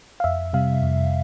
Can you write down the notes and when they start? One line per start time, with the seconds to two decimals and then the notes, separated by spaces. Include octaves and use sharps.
0.20 F5
0.24 F2 E5
0.53 C3 G3 F5
0.83 F2